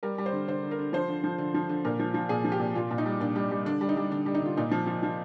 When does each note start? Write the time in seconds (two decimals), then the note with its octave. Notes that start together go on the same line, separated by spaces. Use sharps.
0.03 G3 A#4
0.18 G3
0.26 C5
0.32 D3
0.48 D3 C5
0.63 D3
0.71 A#4
0.79 D3
0.93 F3 C5
1.08 D3
1.24 F3
1.38 D3
1.54 F3
1.69 D3
1.85 A#2 A#4
1.99 F3
2.14 F3
2.29 A#2 G#4
2.44 F3
2.52 G4
2.59 A#2
2.75 A#2 F4
2.91 A#2
2.98 D#4
3.06 G3
3.20 A#2 D4
3.36 G3
3.51 G3
3.66 D3 D4
3.81 G3
3.89 D#4
3.97 G3
4.11 D3 D4
4.26 G3
4.34 D#4
4.41 D3 F4
4.57 A#2 D#4
4.71 F3
4.87 F3
5.03 F3